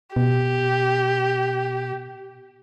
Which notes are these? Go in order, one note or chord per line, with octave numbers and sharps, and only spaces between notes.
B2 G4